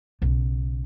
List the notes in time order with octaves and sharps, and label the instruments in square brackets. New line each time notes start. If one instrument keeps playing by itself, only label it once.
[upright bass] B1 C#3